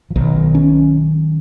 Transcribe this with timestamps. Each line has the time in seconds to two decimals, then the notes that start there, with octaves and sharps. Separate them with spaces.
0.10 F3
0.16 B1 D#3 F#3
0.55 C#4